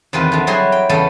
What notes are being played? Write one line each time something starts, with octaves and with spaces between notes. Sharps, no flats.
E2 C3 D#3 G3 F4 B4
D3 F3
F#3 G3 E4 G#4 F#5 C6
G5
E2 C#3 G3 B3 A4